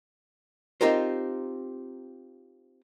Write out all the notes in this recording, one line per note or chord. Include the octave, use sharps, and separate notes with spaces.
C4 D#4 F4 G4 A#4 C5